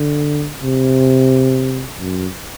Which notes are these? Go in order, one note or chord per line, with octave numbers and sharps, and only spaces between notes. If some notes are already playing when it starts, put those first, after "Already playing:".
Already playing: D3
C3
F#2